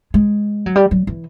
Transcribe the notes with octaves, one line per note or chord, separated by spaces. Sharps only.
G#3
F#3
G3
F#3
E3